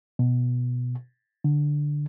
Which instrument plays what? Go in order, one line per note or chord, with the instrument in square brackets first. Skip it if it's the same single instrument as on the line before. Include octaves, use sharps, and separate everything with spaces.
[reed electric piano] B2
D3